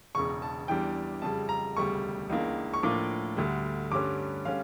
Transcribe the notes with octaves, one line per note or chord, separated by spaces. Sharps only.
E1 E2 C#3 C#6
A5
E2 E3 G3 D4 G5
F2 C#3 G3 A5
A#5
E1 D2 C#3 G3 C#6
C#2 C#3 E3 A#3 D4
C#6
A2 F3 A#3 D4 D6
D2 D3 G3
G2 D3 G3 C#4 D6
D3 G3 C#4 F5